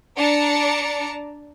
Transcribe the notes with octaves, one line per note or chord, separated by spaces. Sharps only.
D4 D5 A5 A#5 C#7